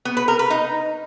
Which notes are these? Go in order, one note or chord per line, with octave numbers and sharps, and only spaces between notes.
B3
B4
A#4
B4
D#4